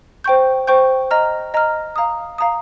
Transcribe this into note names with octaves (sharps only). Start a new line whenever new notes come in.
C5 G5 C#6 G6
C5 G5 C#6 G6
D#5 A#5 F6
D#5 A#5 F6
F5 A#5 D#6
F5 A#5 D#6